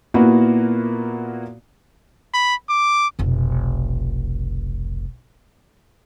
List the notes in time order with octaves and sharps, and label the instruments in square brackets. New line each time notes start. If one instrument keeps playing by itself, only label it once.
[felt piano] A#2 A#3 B3 E4 F#4
[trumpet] B5
D6
[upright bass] F1 B1